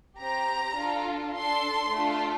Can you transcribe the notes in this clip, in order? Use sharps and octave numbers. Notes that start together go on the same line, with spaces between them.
C4 G4 A#5
D4 F4 A4
D4 A4 C6
A3 D4 F4 A4